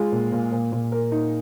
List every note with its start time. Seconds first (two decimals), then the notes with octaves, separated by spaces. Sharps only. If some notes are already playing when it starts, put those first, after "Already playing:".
Already playing: G#3 F4
0.12 A#2
0.32 A#2
0.52 A#2
0.72 A#2
0.92 A#4
1.12 D#4